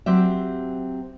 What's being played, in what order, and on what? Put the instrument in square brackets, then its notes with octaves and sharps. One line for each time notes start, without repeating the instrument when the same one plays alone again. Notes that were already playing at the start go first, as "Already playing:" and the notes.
[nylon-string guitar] F#3 C4 G4 E5